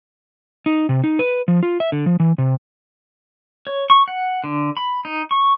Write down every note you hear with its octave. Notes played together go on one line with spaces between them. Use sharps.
D#4
C3
D#4
B4
F3
F4
E5
D3
F3
E3
C3
C#5
C#6
F#5
D3
B5
D#4
C#6